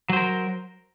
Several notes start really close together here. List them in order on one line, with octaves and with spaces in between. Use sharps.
F#3 C5 A#4